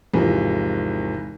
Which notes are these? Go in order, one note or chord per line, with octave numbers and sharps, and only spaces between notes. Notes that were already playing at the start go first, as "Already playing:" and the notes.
G#1 E2 C3 F3